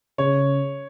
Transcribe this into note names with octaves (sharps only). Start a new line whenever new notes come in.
C#3 C#5